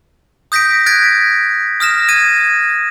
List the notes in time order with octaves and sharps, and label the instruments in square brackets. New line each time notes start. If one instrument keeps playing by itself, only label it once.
[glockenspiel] D#6 G6 A#6 B6 D7
F#6 G#6 A6 B6 D7
D#6 F6 A#6 E7
D#6 G#6 D#7